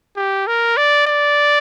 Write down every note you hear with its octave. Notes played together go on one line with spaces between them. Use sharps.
G4
A#4
D5
D5